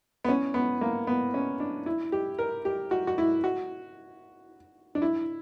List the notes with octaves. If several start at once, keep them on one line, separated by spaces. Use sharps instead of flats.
B3
C#4
B3
A#3
B3
C#4
D4
E4
G4
A#4
G4
F#4
F#4
E4
F#4
D4
E4